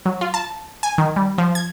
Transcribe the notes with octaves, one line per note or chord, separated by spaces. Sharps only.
F#3
F4
A5
G#5
D#3
G3
F3
G#6